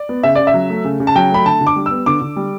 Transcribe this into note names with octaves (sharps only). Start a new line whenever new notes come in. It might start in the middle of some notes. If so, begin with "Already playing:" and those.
Already playing: D5
B3
C#3 E5
C#3 D5
E5
F#3
A3
C#3
C#3
A5
F#3 G5
A3 B5
D3 A5
D3
D6
G3
B3 E6
D3 D6
D3
G3